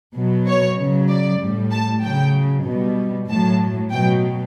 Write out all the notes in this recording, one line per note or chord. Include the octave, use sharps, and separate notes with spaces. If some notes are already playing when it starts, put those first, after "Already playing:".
B2 F#3
C#5
C#3 F#3
D5
A2 G3
A5
C#3 F#3 G5
B2 G3
A2 F#3 A5
B2 F#3 G5